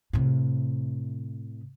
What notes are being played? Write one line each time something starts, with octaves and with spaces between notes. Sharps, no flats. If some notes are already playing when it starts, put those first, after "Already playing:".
A2 C3